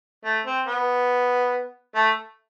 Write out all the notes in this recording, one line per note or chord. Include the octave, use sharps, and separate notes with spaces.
A3
C4
B3
A3